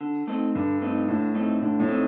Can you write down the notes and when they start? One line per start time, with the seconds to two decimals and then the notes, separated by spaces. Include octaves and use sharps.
0.01 D3
0.28 A3 C4 D#4
0.55 G2 D3
0.82 A3 C4 D#4
1.08 A2 D3
1.35 A3 C4 D#4
1.62 A2 D3
1.80 A2
1.88 A3 C4 D#4